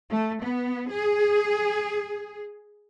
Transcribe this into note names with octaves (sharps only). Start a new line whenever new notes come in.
A3
B3
G#4